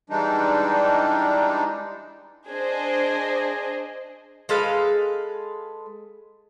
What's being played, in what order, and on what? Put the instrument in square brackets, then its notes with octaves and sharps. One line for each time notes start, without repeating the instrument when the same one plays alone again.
[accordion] E3 G3 G#3 D4 D#4
[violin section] D4 G#4 C5 D#5
[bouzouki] G#3 A4 B4 F5